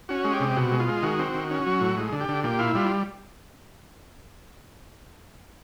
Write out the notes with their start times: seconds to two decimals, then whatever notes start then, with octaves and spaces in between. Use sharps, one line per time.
0.09 C#4 F#4
0.25 G#3
0.33 G4
0.40 C3
0.56 B2 F#4
0.71 G#3
0.80 F4
0.88 G#3
1.03 D#3 F#4
1.19 C4
1.34 D#3
1.51 C#4
1.66 F#3
1.81 A2
1.97 G#3
2.13 D3
2.21 G4
2.29 D3
2.44 A#2 G4
2.59 E4 F4
2.75 G3 F4